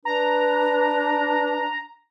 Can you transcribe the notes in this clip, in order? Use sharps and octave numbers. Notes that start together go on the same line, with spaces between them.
D4 B4 A#5